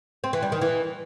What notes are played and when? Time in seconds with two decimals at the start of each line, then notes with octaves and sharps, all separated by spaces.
0.24 C4
0.33 E3
0.43 G3
0.52 D#3
0.61 E3